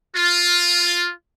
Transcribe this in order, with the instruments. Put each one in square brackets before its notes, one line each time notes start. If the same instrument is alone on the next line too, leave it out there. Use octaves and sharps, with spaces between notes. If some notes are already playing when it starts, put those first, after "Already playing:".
[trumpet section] F4